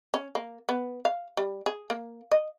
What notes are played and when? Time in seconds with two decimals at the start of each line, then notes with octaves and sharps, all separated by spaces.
0.14 C#4
0.35 A#3
0.69 B3
1.05 F5
1.37 G3
1.66 G#4
1.90 A#3
2.32 D#5